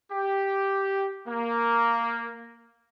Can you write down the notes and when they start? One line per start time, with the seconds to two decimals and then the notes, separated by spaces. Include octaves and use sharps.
0.11 G4
1.28 A#3